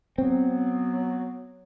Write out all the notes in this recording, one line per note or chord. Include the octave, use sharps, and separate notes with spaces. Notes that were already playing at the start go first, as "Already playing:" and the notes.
F#3 B3 C4